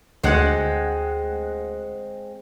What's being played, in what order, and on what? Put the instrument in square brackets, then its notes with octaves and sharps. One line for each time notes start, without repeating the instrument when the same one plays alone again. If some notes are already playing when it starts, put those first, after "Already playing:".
[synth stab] D2 F#5 [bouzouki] G#3 C4